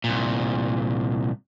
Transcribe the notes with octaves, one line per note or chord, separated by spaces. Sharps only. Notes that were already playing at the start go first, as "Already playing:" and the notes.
C2 A#2